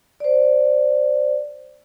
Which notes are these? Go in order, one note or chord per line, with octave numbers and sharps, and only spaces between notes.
C5 D5